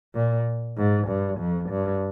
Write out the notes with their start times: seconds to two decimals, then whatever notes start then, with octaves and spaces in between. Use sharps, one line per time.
0.15 A#2
0.77 G#2
1.08 G2
1.39 F2
1.70 G2